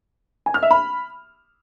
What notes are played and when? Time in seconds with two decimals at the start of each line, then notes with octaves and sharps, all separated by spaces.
0.46 G#5
0.54 F6
0.62 E5
0.71 B5